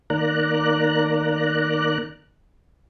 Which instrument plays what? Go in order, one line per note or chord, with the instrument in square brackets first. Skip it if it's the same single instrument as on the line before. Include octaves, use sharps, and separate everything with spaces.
[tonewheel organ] D#3 A#3 D5 A#5 F#6